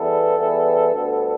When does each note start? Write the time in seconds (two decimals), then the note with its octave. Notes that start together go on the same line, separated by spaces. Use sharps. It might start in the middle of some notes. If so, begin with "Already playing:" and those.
Already playing: E2 E3 G3 B3 A4
0.37 E2 E3 G3 B3
0.92 D2 D3 G3 B3